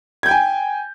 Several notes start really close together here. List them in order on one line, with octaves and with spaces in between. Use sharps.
G#6 G6 G5 G#5